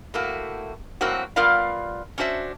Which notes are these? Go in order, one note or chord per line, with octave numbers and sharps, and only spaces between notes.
A2 A3 A#3 F#4
A2 F#3 A#3 C4 F#4
G3 B3 F4 A#4 D5 F5
C#4 D4 F#4 C5 E5